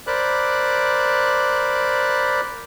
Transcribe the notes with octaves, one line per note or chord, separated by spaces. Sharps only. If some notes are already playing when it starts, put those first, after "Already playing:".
A#4 C5 D5 B5 D6 F#6